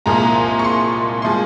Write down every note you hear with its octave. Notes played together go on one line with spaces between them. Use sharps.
C2 A#2 F3 G#3 A#5
C#6
C6
F3 G#3 C6